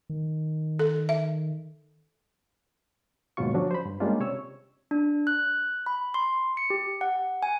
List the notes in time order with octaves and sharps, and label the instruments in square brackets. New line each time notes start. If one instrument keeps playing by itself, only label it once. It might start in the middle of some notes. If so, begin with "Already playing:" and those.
[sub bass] D#3
[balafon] A4
E5
[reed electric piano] D#2 G#2 B2 F#3 F4 C#6
D3 F3 F#3 C#4 D4 F#4
C5 B5
G2
G3 G#3 A#3 C#4 D4 F4
C3 C#5 E6
[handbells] D4
F#6
B5
C6
C#7
G4
F#5
G#5